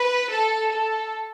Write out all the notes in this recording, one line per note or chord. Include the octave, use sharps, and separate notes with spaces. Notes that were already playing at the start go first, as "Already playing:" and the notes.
Already playing: B4
A4
A4